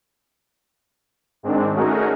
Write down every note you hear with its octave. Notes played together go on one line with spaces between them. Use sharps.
G#2 D#3 G#3 C4 D4
A3 C#4 D#4 F#4 G#4 A#4